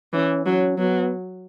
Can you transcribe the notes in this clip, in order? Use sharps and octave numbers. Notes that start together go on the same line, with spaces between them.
E3 C#4
F#3 C#4
F#3 B3